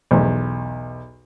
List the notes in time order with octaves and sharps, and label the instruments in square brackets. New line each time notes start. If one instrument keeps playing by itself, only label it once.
[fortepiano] B1 E2